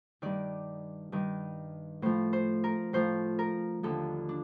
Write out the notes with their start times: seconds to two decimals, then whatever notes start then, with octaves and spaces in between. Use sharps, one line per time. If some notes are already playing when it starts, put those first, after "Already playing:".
0.22 G2 D#3 D5
1.12 G2 D#3
2.02 A2 F3 C5
2.33 C5
2.64 A#4
2.93 A2 F3 C5
3.39 A#4
3.83 D#2 D3 F3 A4
4.29 D4